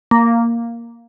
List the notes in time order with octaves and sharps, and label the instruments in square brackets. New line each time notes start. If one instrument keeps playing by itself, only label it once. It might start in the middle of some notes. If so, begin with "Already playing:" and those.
[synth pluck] A#3